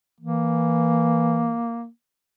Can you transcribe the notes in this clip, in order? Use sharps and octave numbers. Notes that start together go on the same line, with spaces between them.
E3 A#3